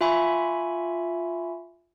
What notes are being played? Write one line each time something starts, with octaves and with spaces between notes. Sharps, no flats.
F4 E5 G#5 B5 C#6